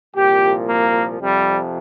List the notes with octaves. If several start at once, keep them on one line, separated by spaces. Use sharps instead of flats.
C2 A#2 F3 G4
A#3
F2 C3 F3 G3